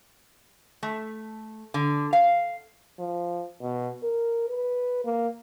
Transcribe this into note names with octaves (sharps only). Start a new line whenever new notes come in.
A3
D3
F5
F3
B2
A#4
B4
A#3